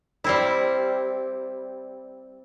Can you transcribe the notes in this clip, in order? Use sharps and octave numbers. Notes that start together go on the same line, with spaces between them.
G3 C4 E4